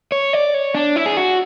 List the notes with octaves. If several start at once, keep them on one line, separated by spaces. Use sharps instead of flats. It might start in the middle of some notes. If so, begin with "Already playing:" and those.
C#5
D5
C#5
D4
E4
G#4
F#4